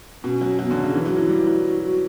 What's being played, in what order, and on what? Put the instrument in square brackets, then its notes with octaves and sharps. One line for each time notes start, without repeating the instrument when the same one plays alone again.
[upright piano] B2 [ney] C#4
[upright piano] F#3
F#3
[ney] B3
[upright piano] D3
[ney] C#4
[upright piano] C#3 [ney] D4
[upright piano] E3 [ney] E4
[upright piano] F#3
E3
G3
F#3
[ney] F#4
F#4